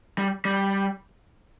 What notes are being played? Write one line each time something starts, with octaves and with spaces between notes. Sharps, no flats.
G3
G3